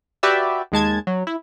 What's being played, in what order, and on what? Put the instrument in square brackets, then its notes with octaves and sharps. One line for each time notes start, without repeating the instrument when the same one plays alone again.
[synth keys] F#4 G4 B4 D5 E5
D#2 G#3 A5 G#6
F#3
E4